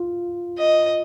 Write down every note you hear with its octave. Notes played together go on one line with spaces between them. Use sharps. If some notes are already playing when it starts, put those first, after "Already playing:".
Already playing: F4
D#5